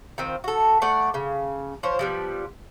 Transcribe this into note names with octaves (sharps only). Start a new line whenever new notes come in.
D#3 F3 C4
F#4 A4
A3 D5 F#5
C#3
F3 C5 C#5
F3 G3 B3